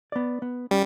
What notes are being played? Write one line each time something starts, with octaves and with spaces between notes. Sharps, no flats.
B3 D5
B3
G3 C#4